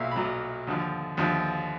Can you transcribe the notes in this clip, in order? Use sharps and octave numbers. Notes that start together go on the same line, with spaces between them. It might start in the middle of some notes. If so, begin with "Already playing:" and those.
Already playing: B1 A#2 F#3 E5 F5
B5
B1 A#2 F#3 A#5
D#2 D3 F3
D#2 D3 F3